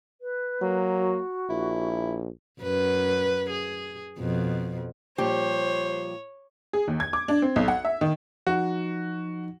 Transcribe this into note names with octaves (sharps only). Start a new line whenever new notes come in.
B4
F#3 A#3
F#4
A#1 E4
F#2 B4
G#4
F2 B2
A#2 F3 G3 G4 C5 C#5
G#4
D#2
G#6
D6
D4
C4
B1
F#5
E5
D#3
F3 D#4 F#4